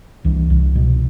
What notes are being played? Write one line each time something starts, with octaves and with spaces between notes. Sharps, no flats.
C2 E3
C2
B2